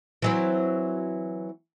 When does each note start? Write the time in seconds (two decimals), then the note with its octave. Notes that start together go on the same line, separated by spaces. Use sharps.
0.22 E3 F#3 C4